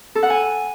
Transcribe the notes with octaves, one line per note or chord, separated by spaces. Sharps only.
A4
F#5
G#5